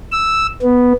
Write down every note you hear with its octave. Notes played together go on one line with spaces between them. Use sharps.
E6
B3